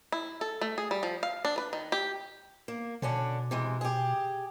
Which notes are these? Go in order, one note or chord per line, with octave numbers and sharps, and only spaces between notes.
E4
A4
A3
G#4
G3
F3
F5
D4
B4
D#3
G4
A#3
B2 D3 C#4 D4
C3 E3 G#3
G4 G#4